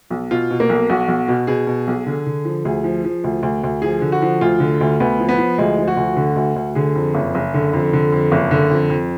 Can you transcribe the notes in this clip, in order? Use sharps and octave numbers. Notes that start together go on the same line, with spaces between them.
B1
B2 F4
B2
A#3
B1
B1 F#4
B1
B2
B2 G#4
B2
B1
D3
D3
F3
D2 G#4
F3
F3
D2
D2
D2
F3 G#4
D3
F#4
F3
D2 F4
D3
D2
D2 B3
F3
B3
F3
D2 G#3
F3
F#4
D2
D3
D2
D2
D3 G#4
F2
F#1
F#1
D3
F2
D3
F2
F#1
D3
F2
F2